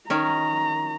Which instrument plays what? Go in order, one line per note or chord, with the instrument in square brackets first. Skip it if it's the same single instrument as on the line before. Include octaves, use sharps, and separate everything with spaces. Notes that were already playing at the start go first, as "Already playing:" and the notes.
[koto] D#3 C#4 [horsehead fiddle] A#5